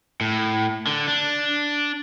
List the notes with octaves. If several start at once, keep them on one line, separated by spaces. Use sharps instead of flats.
A2
D3
D4